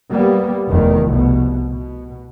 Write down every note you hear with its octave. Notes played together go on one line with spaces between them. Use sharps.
G3 A#3 B3
F1 E2 D#3 A3
C2 B2
B2